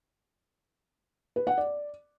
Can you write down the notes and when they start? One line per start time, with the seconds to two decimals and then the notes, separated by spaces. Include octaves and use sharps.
1.36 B4
1.47 F#5
1.58 D5